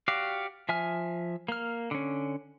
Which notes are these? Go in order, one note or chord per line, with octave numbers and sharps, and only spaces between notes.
F#4 G4 D5 F5
F3 E5 G#5 F6
A#3 F6
D3 C#4